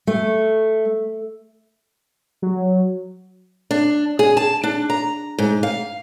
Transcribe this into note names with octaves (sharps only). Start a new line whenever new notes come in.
A3
F#3
D4
G#4
A5
D4
A#5
G#2
F5